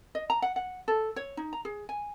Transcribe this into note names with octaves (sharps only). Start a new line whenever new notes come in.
D#5
A#5
F#5
F#5
A4
C#5
D#4
A#5
G#4
G#5